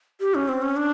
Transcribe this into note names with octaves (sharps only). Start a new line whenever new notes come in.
G4
C#4
C4
C#4
D4